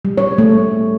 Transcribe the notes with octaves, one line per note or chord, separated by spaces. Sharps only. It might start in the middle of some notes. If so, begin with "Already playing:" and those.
G3
C#5
A3